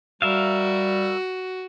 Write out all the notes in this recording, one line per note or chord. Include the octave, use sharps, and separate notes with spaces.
G3 F#4 A#4 E5 F5